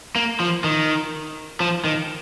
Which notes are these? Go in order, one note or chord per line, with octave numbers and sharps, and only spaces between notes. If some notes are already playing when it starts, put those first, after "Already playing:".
A#3
F3
D#3
F3
D#3